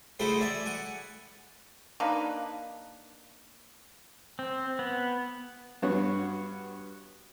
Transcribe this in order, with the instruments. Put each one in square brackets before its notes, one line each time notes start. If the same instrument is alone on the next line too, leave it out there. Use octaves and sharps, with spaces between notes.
[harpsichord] A3 E4 F#4 G#4 C5 G5
D5 E5 G#5
F#5 G#5 C#6
[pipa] A#3 D4 D#4 B4
[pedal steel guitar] C4
B3
[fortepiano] G2 B3 F#4 C#5 F#5